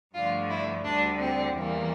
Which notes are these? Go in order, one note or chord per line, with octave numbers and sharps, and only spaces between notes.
G2 D3 F3 A3 F4
E4
D2 D3 G3 D4
C4
E2 E3 G3 A#3